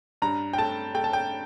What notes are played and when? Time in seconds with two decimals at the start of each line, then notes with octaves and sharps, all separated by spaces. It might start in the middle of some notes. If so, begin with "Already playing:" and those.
0.22 G2 A#5
0.53 G5
0.58 A3 A5
0.95 A3 G5
1.04 A5
1.13 G5